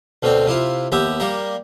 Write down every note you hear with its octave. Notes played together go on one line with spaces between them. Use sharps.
D2 B2 D3 C4
C3 E4 F4
D#2 B3 G4 E5
G3 A#3 A#4